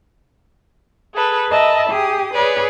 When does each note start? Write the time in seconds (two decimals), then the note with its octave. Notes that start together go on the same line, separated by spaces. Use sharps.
1.14 G#4 A4 B4
1.49 A#4 D#5 E5 A5 B5
1.89 G4 G#4 D#6
2.34 G#4 B4 C#5 D5